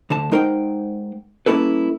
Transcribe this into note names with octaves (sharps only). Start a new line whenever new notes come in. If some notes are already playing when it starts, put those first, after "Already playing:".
D2 D3 A5
G#3 D#4 A#4 C5 F#5 G5
G3 A#3 C#4 E4 A4 B4